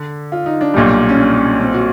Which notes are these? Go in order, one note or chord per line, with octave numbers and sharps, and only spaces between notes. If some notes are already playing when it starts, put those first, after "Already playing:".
Already playing: D3
F4
D#4
D4
B1 A#2 G3
C#4
D4
C#4
C4
F#4